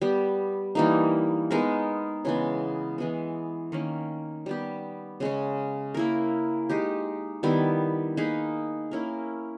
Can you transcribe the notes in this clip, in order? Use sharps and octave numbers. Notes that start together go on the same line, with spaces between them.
G3 B3 G4
E3 G3 A#3 D#4
G#3 B3 D#4 A#4
C#3 E3 G#3 B3
E3 G#3 B3
D#3 A#3 C#4
G3 B3 G4
C#3 G#3 C#4
A#3 E4 A#4
G#3 D#4 G4
D#3 G3 B3 E4
A#3 D#4 G#4 B4
A#3 C#4 E4 A#4